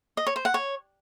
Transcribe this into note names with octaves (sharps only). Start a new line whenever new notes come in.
D#5
C#5
C5
F#5
C#5